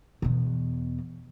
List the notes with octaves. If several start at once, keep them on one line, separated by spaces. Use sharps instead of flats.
E2 B2